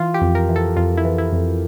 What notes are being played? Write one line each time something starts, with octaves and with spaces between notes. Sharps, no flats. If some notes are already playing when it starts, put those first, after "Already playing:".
Already playing: E3 F4
G4
F2
A#4
E3
A4
F2 F4
E4
E3
E4
F2